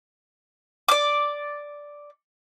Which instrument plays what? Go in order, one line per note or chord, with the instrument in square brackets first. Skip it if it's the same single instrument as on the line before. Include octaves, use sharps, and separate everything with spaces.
[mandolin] D5 D6